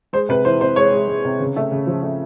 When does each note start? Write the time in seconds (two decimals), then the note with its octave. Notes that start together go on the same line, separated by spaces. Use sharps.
0.13 G#3 C5
0.29 C3 B4
0.45 E3 C5
0.61 C3 C5
0.76 G#3 C#5
0.93 G#3
1.08 G#3
1.25 C3
1.40 C#3
1.56 A3
1.71 C#3
1.87 F3
2.03 A3